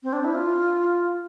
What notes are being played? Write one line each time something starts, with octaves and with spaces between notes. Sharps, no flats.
C4
D4
E4
F4